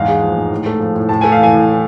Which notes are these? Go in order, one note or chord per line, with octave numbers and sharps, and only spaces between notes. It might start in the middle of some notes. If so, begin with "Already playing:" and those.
Already playing: E2 G#2 F5
G#3
F3
G#2
A2
A3
F3
A2
A2 A5
A3 G#5
F5
E3 G#5
A2